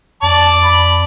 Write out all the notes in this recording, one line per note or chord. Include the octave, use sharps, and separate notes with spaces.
F2 D5 A5
B5